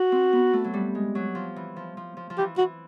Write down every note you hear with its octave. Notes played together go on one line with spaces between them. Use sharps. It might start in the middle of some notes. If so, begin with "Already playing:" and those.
Already playing: F#4
C4
B3
A3
F#3
G3
G#3
F#3
F3
E3
F3
F3
F3
F3
E3 G4
E3 F#4